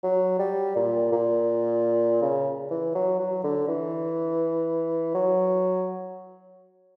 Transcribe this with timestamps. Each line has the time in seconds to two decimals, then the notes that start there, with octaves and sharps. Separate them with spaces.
0.03 F#3
0.39 G3
0.76 A#2
1.12 A#2
2.22 C#3
2.71 E3
2.95 F#3
3.19 F#3
3.44 D3
3.68 E3
5.15 F#3